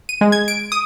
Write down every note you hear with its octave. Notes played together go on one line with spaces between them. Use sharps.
D#7
G#3
G#6
D7
D#6